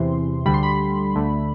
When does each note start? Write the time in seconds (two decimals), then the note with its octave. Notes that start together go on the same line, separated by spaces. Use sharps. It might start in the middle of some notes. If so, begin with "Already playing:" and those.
Already playing: E2 C3 E3 C6
0.45 D2 D3 G3 B5
0.54 C6
0.63 B5
1.15 D2 D3 A3